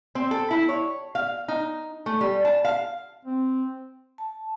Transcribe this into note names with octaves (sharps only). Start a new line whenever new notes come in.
C4
A4
E4
C#5
F5
D#4
A3
G3
A5
F5
C4
A5